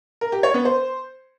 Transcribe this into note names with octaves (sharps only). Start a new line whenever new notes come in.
A#4
G4
C#5
B3
C5